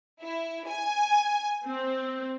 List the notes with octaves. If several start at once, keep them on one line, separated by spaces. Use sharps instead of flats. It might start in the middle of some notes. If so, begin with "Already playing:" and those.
E4
G#5
C4